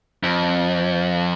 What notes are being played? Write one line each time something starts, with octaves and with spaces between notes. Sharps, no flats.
F2